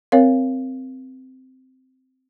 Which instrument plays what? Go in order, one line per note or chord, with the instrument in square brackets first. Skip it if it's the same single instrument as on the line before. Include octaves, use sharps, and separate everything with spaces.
[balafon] C4 A#4 C#5 F5